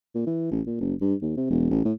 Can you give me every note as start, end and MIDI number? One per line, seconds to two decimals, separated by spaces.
0.15 0.22 46
0.27 0.47 52
0.51 0.61 33
0.67 0.78 46
0.81 0.94 30
1.01 1.14 43
1.22 1.32 39
1.37 1.50 48
1.50 1.69 28
1.71 1.84 33
1.85 1.93 45